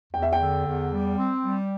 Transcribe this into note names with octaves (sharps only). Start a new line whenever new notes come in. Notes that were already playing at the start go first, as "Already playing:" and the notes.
E2 G5
E5
G5
D3
E2
G3
C4
G3